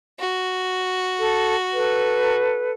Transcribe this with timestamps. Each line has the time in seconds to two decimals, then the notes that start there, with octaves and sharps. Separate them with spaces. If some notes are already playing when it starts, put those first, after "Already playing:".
0.19 F#4
1.18 A4
1.73 A4 B4